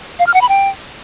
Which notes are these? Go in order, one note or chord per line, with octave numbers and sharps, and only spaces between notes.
F5
F6
F#5
B5
G5